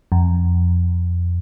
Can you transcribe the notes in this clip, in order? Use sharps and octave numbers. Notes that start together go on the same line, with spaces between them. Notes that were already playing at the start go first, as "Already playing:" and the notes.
F2